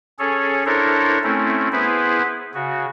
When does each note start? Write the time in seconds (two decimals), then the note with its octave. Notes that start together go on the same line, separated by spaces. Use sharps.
0.19 C#4 G#4 A4 C#5
0.66 D4 E4 A4 A#4 C5 C#5
1.24 A3 C4 C#4 E4
1.72 B3 E4 G#4 B4 C5
2.55 C#3 F#4